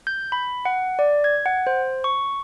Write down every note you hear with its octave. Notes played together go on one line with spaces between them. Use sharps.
G6
B5
F#5
D5
G#6
F#5
C5
C#6